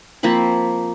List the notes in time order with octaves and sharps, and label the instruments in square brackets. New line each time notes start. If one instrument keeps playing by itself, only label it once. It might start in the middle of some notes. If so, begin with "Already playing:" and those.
[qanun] F3 A#3 C4 B5